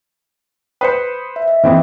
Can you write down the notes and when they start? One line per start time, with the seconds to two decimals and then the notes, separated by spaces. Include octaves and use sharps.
0.81 B4 C5 D#6 C#7
1.36 E5
1.48 D#5 E5
1.64 E3 C4 E4 B4 G5 D#6